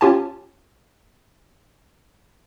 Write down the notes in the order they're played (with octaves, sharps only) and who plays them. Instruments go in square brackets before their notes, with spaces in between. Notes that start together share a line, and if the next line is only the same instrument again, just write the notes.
[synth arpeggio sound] C#4 F4 G4 G#5 A5